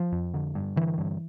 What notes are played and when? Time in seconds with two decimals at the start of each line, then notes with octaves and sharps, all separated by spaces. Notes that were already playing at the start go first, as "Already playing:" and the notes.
Already playing: F3
0.12 F2
0.34 D3
0.55 G2
0.76 D3 E3
0.98 G2